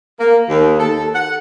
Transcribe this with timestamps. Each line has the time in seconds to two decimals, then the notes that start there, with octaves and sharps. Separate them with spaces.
0.18 A#3
0.49 D#2
0.79 A4
1.14 F#5